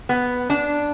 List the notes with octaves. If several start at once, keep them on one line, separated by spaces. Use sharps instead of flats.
B3
D4